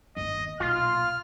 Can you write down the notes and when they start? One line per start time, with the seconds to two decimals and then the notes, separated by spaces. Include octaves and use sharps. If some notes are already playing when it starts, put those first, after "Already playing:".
0.17 G1 D#2 D#5
0.60 B1 A#2 F4 F6